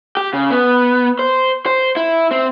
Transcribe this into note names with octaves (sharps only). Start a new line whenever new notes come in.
G4
C#3
B3
C5
C5
E4
C4